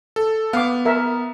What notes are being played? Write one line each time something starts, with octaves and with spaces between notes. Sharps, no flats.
A4
B3 F5 F#5 D6
A#4 E5